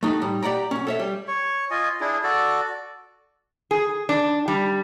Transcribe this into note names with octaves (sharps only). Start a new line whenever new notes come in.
A3 D#4 F#4 G4
A2 G3
G4 D5 F#5 G5 A#5
B1 C#4
A4 C#5 E5
G3
C#5 C#6
F4 D#5 G#5
D4 E4 G#4
F#4 A4 D5
G#4
D4
G3